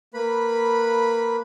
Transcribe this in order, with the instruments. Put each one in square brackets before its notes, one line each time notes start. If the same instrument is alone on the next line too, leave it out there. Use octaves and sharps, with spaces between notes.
[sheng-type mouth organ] A#3 B4 B5